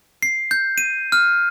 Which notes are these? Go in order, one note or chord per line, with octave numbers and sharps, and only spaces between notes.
C7
G6
D#7
F6